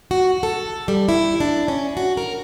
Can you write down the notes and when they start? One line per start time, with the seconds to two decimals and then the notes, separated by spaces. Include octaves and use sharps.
0.11 F#4
0.43 A4
0.88 G3
1.09 E4
1.40 D4
1.68 C#4
1.97 F#4
2.17 A#4